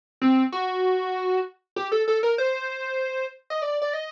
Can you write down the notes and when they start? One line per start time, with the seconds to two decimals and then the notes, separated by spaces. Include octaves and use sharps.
0.22 C4
0.52 F#4
1.76 G4
1.92 A4
2.08 A4
2.23 A#4
2.38 C5
3.50 D#5
3.62 D5
3.82 D5
3.93 D#5